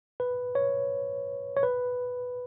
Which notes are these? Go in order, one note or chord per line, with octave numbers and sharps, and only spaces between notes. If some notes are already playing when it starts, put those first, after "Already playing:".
B4
C#5
C#5
B4